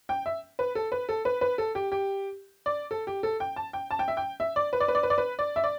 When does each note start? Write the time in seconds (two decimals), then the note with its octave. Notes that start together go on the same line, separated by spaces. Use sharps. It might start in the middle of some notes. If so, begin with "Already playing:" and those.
0.09 G5
0.26 E5
0.59 B4
0.75 A4
0.92 B4
1.09 A4
1.25 B4
1.41 B4
1.58 A4
1.75 G4
1.92 G4
2.66 D5
2.91 A4
3.07 G4
3.23 A4
3.40 G5
3.56 A5
3.73 G5
3.91 A5
3.99 G5
4.08 E5
4.17 G5
4.40 E5
4.56 D5
4.73 B4
4.80 D5
4.88 B4
4.95 D5
5.03 B4
5.10 D5
5.18 B4
5.39 D5
5.56 E5
5.64 D5